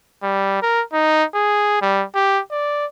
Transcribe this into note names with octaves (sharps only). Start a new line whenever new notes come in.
G3
A#4
D#4
G#4
G3
G4
D5